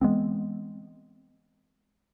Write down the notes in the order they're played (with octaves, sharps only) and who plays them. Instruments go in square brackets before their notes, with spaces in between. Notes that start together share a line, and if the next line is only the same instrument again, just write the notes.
[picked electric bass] E3 G#3 B3 C4